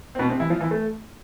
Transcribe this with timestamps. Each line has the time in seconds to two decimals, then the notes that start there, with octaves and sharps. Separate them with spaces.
0.15 C4
0.19 B2 B3
0.30 C3 C4
0.40 E3 E4
0.50 F3 F4
0.61 E3 E4
0.71 A3